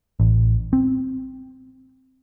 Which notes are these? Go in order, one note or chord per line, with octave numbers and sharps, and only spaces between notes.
A1
C4